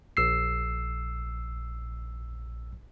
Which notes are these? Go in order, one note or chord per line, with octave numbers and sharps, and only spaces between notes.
A#1 E6 C7